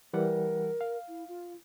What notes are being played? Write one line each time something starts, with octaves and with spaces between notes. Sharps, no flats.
E3 G3 A#4 F#5
F5
E4
F4